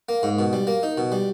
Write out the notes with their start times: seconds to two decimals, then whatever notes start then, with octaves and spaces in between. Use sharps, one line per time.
0.09 A#3
0.23 G#2
0.39 B2
0.53 G3
0.67 A#3
0.83 D#4
0.98 B2
1.12 G3